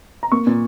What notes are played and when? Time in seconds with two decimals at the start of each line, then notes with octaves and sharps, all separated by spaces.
0.23 A#5
0.32 A#3 C#6
0.47 A#2